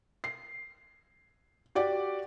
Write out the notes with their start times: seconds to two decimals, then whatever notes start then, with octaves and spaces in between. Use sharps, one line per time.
0.24 C7
1.75 F#4 G4 D5 F#5